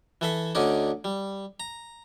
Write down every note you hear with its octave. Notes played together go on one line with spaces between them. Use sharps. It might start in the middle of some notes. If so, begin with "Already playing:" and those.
E3 A4 E5
D2 D3 C#4 D#4 D5
G3
A#5